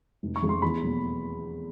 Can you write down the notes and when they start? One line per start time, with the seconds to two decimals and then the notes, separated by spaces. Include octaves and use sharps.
0.23 F1
0.36 C#6
0.42 F2 C#3 F3 G#3
0.49 C6
0.62 E2 B5
0.82 B2 F#3 A#3